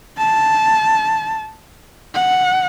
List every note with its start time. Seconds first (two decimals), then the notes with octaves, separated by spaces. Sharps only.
0.18 A5
2.14 F#5